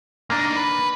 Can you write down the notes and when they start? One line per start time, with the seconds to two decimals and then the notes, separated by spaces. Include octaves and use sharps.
0.30 C#2 A#3 D4 D#4
0.56 B4